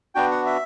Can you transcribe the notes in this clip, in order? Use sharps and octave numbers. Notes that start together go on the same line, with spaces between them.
B3 D4 F#4 G5
F#5
E5